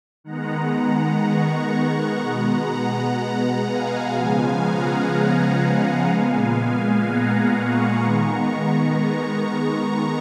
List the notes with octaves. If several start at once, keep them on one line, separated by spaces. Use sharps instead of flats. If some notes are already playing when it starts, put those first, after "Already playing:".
D#3 G#3 B3 F#5 A#5
A#5 C#6
F#5 A#5
B2 G#3 B3
F#5 A#5
F5 G#5
C#3 F3 G#3 B3
F#5 A#5
F#5 A#5
A#2 G#3 B3 F5 G#5
F#5 A#5
A#5 C#6
D#3 G#3 B3
A#5 C#6